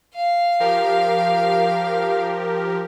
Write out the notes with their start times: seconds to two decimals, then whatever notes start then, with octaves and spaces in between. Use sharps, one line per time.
0.15 F5
0.60 F3 G4 A#4